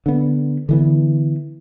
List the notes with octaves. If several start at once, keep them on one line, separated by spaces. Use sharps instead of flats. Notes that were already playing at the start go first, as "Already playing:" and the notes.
D3 B3
D3 E3 B3